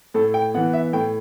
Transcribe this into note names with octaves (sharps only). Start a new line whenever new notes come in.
A2 A4
G5
E3 B3 F#5
E5
A2 G5